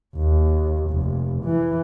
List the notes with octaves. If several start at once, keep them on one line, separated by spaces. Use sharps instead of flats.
D#2
F1
E3